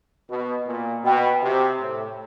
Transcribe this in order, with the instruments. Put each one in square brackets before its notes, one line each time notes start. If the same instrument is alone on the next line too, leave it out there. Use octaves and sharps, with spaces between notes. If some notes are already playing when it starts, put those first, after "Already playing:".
[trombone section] B2
A#2
[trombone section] B2 [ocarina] G5
[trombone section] C3
A2